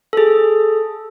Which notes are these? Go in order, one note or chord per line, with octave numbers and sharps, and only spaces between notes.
G#4 A4